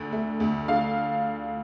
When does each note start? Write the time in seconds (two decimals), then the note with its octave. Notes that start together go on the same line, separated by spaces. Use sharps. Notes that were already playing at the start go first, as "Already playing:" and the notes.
Already playing: D2 D3
0.12 A3
0.40 D2
0.68 D3 F5